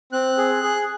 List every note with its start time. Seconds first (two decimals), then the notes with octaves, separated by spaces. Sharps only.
0.12 C4 F#6
0.37 G#4
0.63 G#4